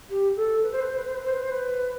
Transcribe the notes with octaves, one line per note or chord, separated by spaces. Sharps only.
G4
A4
B4
C5
B4
C5
B4
C5
B4
C5
B4
C5
B4